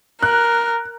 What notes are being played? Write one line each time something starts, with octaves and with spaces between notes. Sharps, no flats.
A#4 F#6